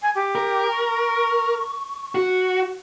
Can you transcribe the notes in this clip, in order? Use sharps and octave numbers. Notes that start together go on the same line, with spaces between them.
G#5
G4
A#4
C#6
F#4